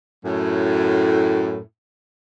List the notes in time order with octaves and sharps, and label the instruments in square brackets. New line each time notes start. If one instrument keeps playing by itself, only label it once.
[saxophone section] F#2 A2